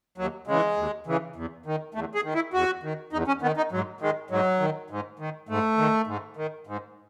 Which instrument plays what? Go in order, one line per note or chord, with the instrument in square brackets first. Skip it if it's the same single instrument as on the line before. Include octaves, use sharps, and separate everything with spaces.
[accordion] D#2 F#3
C#3 E3 G#3
D#2
C#3 E3
E2
D#3
E2 A3
G#4
D#3
E4
E2 F#4
D#3
E2 D#4
C#4
D#3 B3
D#4
G#2 F#3
D#3 G#3
G#2 F#3
D#3
G#2
D#3
G#2 A3
D#3
G#2
D#3
G#2